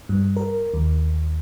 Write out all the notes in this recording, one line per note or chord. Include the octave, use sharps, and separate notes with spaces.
G2
A#4
D#2